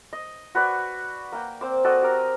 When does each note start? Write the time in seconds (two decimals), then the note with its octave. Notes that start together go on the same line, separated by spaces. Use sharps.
0.13 D#5
0.55 F#4 B4 D5 C#6
1.32 A#3 G5
1.61 C4 C5 D6
1.84 F#4 A4 D5 D#5
2.03 G4 A#4